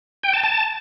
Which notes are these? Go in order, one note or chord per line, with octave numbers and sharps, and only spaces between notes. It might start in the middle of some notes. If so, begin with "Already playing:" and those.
G5
A5
A5